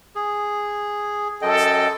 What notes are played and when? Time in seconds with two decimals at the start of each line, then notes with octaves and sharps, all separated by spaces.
0.15 G#4
1.42 F#2 A4 D#5 G5